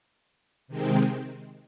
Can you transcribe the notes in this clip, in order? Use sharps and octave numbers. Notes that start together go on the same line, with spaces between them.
C3 D#3 G#3 C4